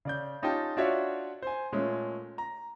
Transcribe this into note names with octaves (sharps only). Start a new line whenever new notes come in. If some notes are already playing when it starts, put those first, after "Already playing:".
C#3 D5 G6
C#4 D#4 F4 G4 G5 A5
D4 F4 F#4 C#5 D5 E5
C5 G#5
A#2 G#3 A3 C#4
A#5